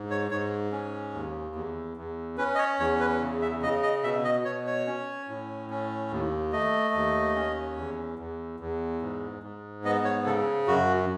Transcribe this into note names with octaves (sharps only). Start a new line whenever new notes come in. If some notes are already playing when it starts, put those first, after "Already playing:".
Already playing: G#2
C#5
G#2 C#5
C#4
D#2
E2
E2
C#4 B4
D#5
C#5
E2 C#5
B4
C#3
E5
C#3 D#5
D#5
B2 E5
D#5
B2 C#5
C#5
C#4
A2
C#4
D#2
A3 D#5
D#2
C#4
E2
E2
E2
G#2
G#2
B3 D#5
C#5
C#3 A4
F#2 F#4